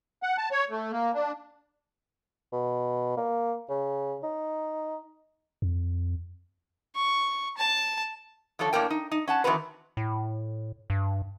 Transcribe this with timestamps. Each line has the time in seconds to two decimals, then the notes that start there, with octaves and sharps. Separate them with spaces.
0.23 F#5
0.38 A5
0.52 C#5
0.70 A3
0.92 A#3
1.14 D4
2.53 B2
3.17 A#3
3.69 C#3
4.23 D#4
5.62 F2
6.96 C#6
7.57 A5
8.59 D3 F3 A3 A4 C#5
8.73 A2 A#3 D4 A#4 G5
8.91 D#4
9.12 D#4
9.28 C#4 F#5 A5
9.44 D#3 E3 C4 F#4 A#4 B4
9.97 A2
10.90 G2